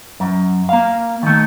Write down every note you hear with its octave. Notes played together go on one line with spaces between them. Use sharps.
F#2
A#3 F5
D#3 A3